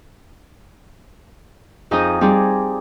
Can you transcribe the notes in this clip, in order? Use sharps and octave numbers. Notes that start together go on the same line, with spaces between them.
F2 D#4 G#4 D#5 D#6 G6
G3 C4 D#4 G#4 D5